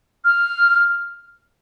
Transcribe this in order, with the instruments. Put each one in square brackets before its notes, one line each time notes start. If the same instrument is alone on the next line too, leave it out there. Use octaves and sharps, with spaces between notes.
[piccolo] F6